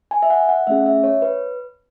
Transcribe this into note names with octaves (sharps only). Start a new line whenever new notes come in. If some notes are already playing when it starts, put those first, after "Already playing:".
G#5
E5
F#5
F#5
A3 C#4 G#4 E5
E5
C#5
B4